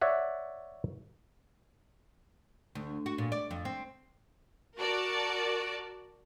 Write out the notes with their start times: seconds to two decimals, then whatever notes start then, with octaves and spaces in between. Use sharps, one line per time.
0.01 C#5 D5 E5 F#5
2.75 D2
3.06 F#4
3.18 A#2
3.32 D5
3.51 F2
3.65 C4
4.78 F#4 A#4 D5 A5